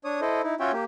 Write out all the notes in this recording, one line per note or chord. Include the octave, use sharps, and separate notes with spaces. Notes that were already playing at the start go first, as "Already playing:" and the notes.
D4 C#5 D#6
E4 A4 C5 D#5
D#4 E4
C#4 F4 F#4 C#5 E5 G5
A#3 G4